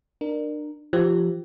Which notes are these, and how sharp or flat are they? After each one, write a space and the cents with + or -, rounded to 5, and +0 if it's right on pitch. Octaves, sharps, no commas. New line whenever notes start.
D4 +30 A#4 +0
F3 -15 G4 -15